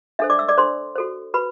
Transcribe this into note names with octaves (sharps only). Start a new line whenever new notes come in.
D4 A4 C5 E5
D5 D6
E5 E6
D5 D6
D4 A4 C5 C6
F#4 A4 C5
F#4 B4 B5